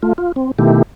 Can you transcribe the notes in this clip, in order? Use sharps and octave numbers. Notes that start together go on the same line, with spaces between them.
A3 F4
F4
C4
B2 D#3 A3 E4 G4